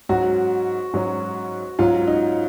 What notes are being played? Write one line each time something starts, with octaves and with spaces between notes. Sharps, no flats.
G#2 F#3 C#4 F#4
G#2 F#3 C#4
G#2 F#3 C#4 F4
D#4